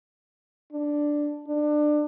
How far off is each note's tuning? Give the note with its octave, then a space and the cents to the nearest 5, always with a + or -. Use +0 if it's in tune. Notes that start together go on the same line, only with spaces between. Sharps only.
D4 +0
D4 +25